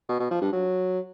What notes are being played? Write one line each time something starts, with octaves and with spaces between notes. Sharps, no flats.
B2
B2
F3
G2
F#3